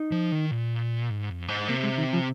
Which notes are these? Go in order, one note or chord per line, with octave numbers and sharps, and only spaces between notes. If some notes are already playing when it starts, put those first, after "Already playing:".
Already playing: D#4
F3
D#3
A#2
G#2
F2
G#2
C3 A#3
G#3
D#3
F3